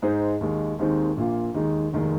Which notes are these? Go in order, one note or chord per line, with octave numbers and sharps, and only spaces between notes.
G#2 G#3 D#4 G#4 C5
D#2 D#3 G#3
D#2 D#3 G#3 C4 D#4
A#1 A#2 A#3 F4
D#2 D#3 G#3 D#4
F1 D#2 D#3 G#3